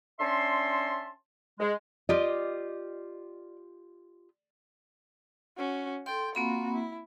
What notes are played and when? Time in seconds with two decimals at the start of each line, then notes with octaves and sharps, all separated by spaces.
0.20 C#4 D4 E5 A5 C6
1.60 G#3
2.09 F4 G4 D5 D#5
5.57 C#4 F#4
6.06 A4 G5 C6
6.35 A#3 C4 F4 F#4 B5
6.74 E4